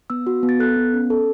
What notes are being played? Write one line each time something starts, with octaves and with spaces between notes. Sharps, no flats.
B3 E6
F#4
B3
A6
A4 F#6
B3
C#4
A4